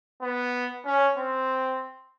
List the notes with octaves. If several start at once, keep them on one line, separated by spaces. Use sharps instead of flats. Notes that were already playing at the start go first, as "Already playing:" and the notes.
B3
C#4
C4